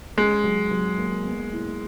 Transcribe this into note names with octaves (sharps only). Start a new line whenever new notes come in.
G#3 C#4
F#3
F#3
A#3
B3
E4